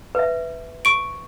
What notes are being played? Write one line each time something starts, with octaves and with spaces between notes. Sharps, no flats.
B4 E5
C#6 D7